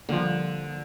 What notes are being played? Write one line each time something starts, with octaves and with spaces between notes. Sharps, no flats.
D3 F3 G3 A#3